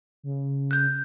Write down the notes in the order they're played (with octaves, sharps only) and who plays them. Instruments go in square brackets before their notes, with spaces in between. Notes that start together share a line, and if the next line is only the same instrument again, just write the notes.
[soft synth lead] C#3
[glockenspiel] F#6 G6